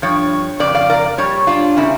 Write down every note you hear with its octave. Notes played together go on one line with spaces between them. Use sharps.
G2 F3 C#5
F2 C#3 D5
D5 F5
A#4 D5
A#2 G3 C#5
D4 F4
C#3 G3 A#3 C#4 E4